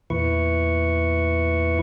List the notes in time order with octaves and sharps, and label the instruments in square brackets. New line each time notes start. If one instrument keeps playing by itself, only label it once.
[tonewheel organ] E2 A#2 E3 E4 B4 C#6